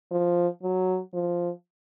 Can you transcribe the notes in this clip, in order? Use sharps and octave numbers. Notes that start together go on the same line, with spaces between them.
F3
F#3
F3